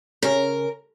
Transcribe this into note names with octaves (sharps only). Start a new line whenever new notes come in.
C#3 C#4 A#4